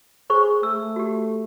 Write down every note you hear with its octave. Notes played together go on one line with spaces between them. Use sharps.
G#4 C5 C#6
A3 E6
F#4 G4